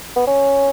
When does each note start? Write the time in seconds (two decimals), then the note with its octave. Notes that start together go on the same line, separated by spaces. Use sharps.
0.16 B3
0.27 C#4